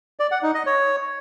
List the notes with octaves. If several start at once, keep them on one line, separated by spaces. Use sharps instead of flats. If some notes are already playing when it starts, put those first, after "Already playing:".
D5
F#5
D#4
D#5
C#5